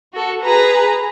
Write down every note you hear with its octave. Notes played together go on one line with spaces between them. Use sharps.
F#4 A4
G#4 B4 A#5